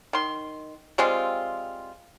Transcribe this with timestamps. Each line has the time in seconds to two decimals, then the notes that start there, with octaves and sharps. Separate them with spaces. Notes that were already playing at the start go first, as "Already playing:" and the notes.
0.13 D#3 C6
0.98 G3 G#3 C4 F4